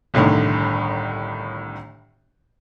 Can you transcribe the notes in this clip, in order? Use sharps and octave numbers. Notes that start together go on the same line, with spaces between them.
G1 C2 A2 D3 D#3